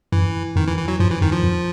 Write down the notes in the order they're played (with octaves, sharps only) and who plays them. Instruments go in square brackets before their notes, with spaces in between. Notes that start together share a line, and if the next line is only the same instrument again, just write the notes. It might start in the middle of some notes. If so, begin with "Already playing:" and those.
[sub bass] F#2 [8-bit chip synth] E3
[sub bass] F2 [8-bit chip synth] D#3
[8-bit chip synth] E3
E3
F#3
[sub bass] F#2 [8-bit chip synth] F3
[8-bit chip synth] E3
[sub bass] F2 [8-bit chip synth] D#3
[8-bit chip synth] F3
[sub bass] F2